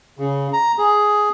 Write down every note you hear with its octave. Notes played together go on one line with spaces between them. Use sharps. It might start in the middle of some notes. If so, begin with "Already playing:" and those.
C#3
A#5
G#4